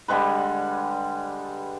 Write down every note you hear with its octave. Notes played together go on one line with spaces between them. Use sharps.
D3 G3 G#3 B4